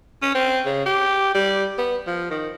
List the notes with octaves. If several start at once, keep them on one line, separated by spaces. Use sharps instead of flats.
C#4
C4
C#3
G4
G3
B3
F3
D#3